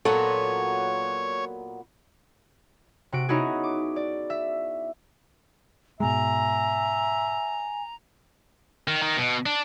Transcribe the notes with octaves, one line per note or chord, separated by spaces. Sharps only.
A#2 F#3 B3 A4 C#5
C3 F#4 D7
B3 C#4 D#4 E4 F#4 G#4
D6
D5
E5
G#2 B2 G#3 E5 G#5 A#5
D#3
D#3
B2
D4